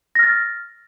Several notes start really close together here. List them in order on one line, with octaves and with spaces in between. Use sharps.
A#6 F6 A6